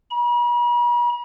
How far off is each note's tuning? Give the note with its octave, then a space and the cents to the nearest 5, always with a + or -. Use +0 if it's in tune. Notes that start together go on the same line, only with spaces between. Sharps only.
B5 -45